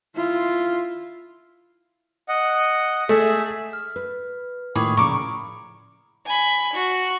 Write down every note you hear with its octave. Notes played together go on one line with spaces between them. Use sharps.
E4 F4
D#5 F#5
A3 G#4 E5
F6
B4
A2 D#3 A#3 F4 G#4 B5 C#6 D6
A#2 C#3 F3 A#5 C#6 D6
G#5 B5
F#4